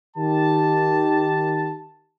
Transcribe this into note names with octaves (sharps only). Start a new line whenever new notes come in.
D#3 G4 A5